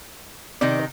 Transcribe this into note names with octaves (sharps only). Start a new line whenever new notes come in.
C3 D#3 D#4 D5